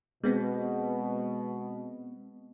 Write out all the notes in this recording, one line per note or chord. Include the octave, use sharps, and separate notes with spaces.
B2 G#3 B3 C4